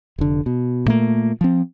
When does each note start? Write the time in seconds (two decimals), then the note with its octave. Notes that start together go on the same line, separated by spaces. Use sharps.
0.18 F1 D3
0.46 B2
0.86 A#2 A3 A#3
1.41 F3 C4